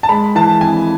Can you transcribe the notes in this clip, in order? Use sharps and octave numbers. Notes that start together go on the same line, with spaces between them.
A5
G#3 B5
E3 A5
F2 G#5